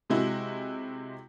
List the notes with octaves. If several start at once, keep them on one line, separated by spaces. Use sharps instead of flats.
C3 G#3 E4 F#4